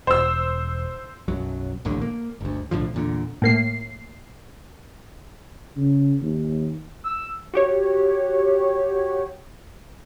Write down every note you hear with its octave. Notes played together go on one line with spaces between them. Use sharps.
E1 C5 E6
B1 F#2 F#3
A#1 D#2 A2 D3
A#3
G1 D2
B1 A2 D3 F3
E2 A#2 D3
A2 A#3 C7
C#3
D#2
E6
F#4 G4 C#5